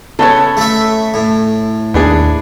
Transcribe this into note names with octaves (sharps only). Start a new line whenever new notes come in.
C#3 B3 A4 C#5
A3 E5
A2
D#2 B3 D4 G#4